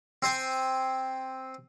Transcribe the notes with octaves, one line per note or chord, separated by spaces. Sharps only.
C4 C5 G#5